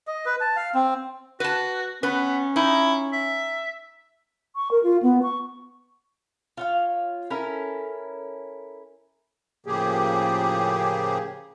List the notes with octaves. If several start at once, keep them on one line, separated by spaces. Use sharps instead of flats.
D#5
B4
A5
F5
C4
F#4 B4 A5
B3 C#4 B4
D#4 E4
E5
C#6
A#4
F4
B3
C#6
F4 C#5 F5
C#4 E4 A4 A#4
A2 C#3 F3 A#3 G4 G#4